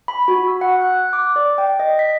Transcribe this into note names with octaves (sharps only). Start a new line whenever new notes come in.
B5
F#4
E6
F#5
F#6
D6
D5
G5
D#5
B6